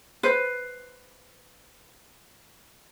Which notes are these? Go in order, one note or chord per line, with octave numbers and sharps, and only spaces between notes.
B4 C5